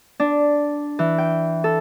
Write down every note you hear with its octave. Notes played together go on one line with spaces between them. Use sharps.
D4
E3
G5
A4